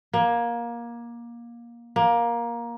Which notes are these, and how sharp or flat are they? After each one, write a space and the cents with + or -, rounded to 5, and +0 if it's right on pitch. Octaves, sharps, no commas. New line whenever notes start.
A#3 +20
A#3 +15